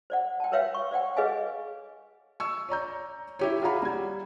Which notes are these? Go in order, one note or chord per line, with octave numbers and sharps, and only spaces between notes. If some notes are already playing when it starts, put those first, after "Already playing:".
C5 D5 F#5
G5 A5
A#4 B4 C#5 E5 F5 G5
C#6
C5 D5 F#5 G5
G#4 B4 C#5 D#5 F5 G#5
C#6 E6
C#5 D5 A#5 G6
E4 G4 C#5
F4 F#4 G#4 F#5 A#5 B5
G3 G#6